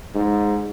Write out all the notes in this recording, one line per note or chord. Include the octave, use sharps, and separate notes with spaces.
G#2